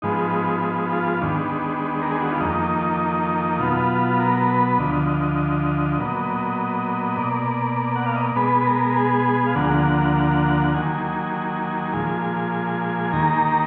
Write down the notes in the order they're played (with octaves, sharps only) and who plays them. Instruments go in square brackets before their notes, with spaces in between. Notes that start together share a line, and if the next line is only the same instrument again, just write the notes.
[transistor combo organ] G#2 F3 G#3 B3 D#4
D#4
F4
D#2 D#3 G#3 B3 D4
A#4
G#4
F#4
F4
F2 D#3 A#3 D#4
B2 F#3 B3 F4
A#4
B4
D2 D3 F3 D#5
A#2 F#3 B3
B2 A#3 D5
F#5
F5
D#5
D5
B2 G#3 B3 B4
A#4
G#4
F5
D2 D3 F3 A#3 F#5
D#2 D#3 F#3 A#3 G#5
A#2 F3 G#3
D#2 D#3 A#3 A#5